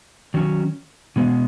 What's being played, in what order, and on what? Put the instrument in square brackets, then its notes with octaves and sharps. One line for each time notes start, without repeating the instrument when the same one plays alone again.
[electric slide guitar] D#3 F#3 C#4
B2 G#3 B3